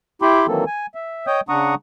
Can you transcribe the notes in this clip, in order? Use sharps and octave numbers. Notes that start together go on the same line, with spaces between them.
E4 G4 G5 B5 C6 D6
D#3 E3 F#3 A#3 C4 A4
G#5
E5
C#5 D#5 G5 D#6 G6
C#3 D4 F#5 A#5 C#6 D#6